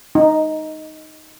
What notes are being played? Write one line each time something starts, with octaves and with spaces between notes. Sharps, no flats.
D#4